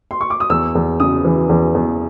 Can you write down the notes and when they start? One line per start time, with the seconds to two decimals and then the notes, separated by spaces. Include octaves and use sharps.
0.11 C6
0.21 C#6
0.30 D6
0.40 D#6
0.50 E2 E6
0.75 E2
1.00 C#3 D#6
1.25 E3
1.49 E2
1.75 E2